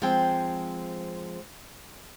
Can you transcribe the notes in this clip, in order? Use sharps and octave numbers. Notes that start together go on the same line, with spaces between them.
F3 G#3 C4 G5